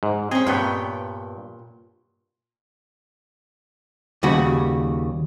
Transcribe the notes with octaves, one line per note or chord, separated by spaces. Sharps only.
G#2
C4 C#4 G#4
G2 A#2 B3 C#5 G5
D#2 C#3 G3 F#4